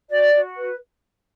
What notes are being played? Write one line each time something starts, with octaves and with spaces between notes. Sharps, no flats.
F#4 D5
F#4
B4